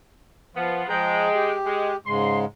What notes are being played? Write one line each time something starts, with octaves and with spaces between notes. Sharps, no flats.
F3 B3 F4
F3 G#3 G#4 G5 A#5
G4
G#3
G#2 C#3 G#3 C6